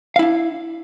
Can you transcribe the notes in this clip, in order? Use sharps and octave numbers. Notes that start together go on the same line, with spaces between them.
D4 E4 F5